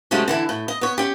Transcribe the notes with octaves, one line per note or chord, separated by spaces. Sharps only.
C3 F#3 G#3 A3 B3 C#4
D3 E3 E4
A2
D#5
B3 C#5
C#4 G4